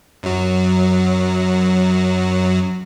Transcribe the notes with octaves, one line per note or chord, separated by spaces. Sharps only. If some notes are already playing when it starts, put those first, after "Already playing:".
F#2 F#3